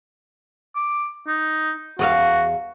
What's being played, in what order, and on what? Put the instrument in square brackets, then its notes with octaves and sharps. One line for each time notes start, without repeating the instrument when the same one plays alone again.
[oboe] D6
D#4
[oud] E2 G#4 F5 [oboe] F#4